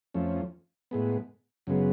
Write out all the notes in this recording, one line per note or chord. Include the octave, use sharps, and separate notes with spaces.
F2 F3 A3 C#4
A2 G#3 B3
F#2 C#3 G#3 B3